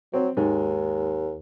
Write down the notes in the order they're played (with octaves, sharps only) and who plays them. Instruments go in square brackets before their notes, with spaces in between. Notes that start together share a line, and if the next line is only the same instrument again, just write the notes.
[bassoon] F#3 [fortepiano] C4
[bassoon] D#2 [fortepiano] G#2